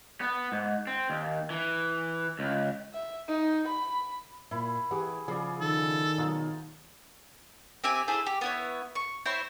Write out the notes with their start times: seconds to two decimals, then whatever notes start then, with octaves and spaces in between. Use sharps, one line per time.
0.21 B3
0.52 G#2
0.87 C4
1.10 D#2
1.50 E3
2.39 C#2
2.94 E5
3.29 D#4
3.68 B5
4.51 A#2 E4 B5
4.91 E3 G4 G#4 F#5
5.28 C#3 F3 G#4 D5
5.61 D#3 A4
6.18 B2 F#3 D#4 F4
7.84 C4 G4 E5 G#5
8.08 E4 G#4 A4 C5
8.26 G4
8.41 B3 E4 C#5
8.95 C#6
9.26 C4 E4 C5 C#5